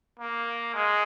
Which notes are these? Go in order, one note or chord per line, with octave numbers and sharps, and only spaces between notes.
A#3
G#3